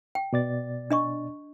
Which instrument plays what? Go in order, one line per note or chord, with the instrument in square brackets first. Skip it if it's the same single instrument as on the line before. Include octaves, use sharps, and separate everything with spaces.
[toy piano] G5
[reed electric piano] B2 D5 A6
[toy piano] D4 D#5 C#6